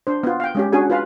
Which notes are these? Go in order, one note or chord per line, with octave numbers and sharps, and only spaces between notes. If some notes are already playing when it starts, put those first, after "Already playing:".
D4 C5
B3 F4
F5 G5
G#3 C#4 G4
C#4 D4 F#4 G#4 G#5
F4 B4 F5